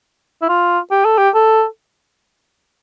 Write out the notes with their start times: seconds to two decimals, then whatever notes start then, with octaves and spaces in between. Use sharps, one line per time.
0.42 E4
0.49 F4
0.91 G4
1.05 A4
1.18 G4
1.35 A4